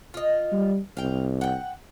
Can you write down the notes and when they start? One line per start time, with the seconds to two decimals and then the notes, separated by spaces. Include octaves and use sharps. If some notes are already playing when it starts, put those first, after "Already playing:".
0.14 F4 D#5
0.52 G3
0.97 C2 F5 G5
1.41 F#5 G5